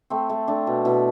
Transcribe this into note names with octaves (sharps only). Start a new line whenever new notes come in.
A3 C4
A3
A3 D4
B2
B2 E4